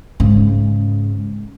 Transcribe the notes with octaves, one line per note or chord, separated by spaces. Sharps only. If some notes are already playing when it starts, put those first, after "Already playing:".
G#2 C#3